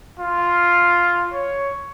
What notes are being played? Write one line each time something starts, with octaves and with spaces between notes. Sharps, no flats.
F4
C#5